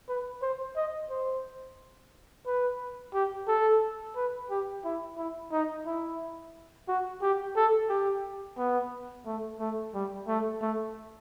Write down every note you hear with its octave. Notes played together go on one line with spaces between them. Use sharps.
B4
C5
D#5
C5
B4
G4
A4
B4
G4
E4
E4
D#4
E4
F#4
G4
A4
G4
B3
A3
A3
G3
A3
A3